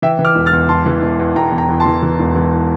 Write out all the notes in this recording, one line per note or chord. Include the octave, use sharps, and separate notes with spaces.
E3 E5 G5
E3
D6 F6
E1
F6 A6
E2
E1 A5 C6
E3
E1
E2
E1 G5 A#5
E2
G5 A#5
E2
A5 C6
E3
E3
E1
E3